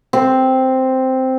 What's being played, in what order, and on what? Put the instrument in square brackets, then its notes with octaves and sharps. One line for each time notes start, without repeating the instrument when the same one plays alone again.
[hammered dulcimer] C4